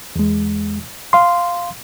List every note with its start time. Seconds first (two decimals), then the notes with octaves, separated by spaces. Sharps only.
0.16 E2 G#3
1.13 F5 C6